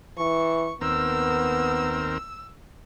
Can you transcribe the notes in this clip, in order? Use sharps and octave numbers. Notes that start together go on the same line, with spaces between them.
E3 C#6
D#2 B3 C4 A#4 E6